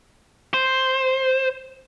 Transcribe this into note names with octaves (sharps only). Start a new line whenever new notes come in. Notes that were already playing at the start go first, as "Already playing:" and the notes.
C5